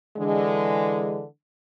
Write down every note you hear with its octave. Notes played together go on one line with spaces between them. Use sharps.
D3 E3 G#3